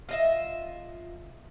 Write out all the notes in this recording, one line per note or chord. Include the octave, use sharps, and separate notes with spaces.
F4 D#5 E5